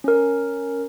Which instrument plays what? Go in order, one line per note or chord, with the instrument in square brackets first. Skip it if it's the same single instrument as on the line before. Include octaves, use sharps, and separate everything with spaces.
[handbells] C#4 A#4